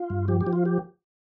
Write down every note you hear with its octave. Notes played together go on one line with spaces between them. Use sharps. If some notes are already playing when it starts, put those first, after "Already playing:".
Already playing: F4
G2
F3 G4
G4
F3
F4
G4